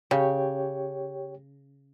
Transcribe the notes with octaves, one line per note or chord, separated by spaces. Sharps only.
C#3 G4 C#5 G5